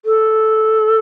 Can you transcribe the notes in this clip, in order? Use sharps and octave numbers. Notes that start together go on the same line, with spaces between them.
A4